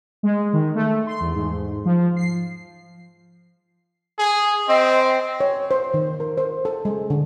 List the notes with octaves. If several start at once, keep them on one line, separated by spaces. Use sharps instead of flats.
G#3
D#3
A3
C6
E2
G#2
F3
C7
G#4
C4 D#5
C#5
C5
D#3
A#4
C5
A4
G#3
D3